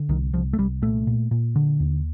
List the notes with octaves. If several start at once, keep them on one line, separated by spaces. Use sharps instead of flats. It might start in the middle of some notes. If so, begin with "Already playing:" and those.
Already playing: D3
C2 D#3
C2 F3
A3
C2 G3
A#2 A3
A#2
A#2
D3
D#2